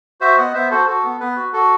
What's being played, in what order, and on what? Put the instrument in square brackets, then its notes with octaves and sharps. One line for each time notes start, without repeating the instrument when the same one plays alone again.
[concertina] F#4 C5 E5
B3 D#5 F#5
B3 C5 E5
F#4 A4 C5
F#4 A4
B3
B3 B4
F#4
F#4 A4